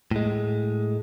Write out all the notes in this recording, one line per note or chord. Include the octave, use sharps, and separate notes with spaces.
A2 G#3